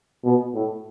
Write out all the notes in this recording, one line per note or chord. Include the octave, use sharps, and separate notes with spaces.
B2
A2